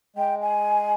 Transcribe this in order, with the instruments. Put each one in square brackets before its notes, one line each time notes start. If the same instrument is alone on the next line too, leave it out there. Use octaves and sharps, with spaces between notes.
[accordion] G#3 [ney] G5
[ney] G#5